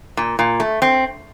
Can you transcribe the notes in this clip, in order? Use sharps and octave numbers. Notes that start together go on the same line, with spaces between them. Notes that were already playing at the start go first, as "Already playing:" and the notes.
A#2
A#2
A3
C4